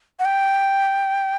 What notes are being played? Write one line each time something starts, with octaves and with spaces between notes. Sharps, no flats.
F#5
G5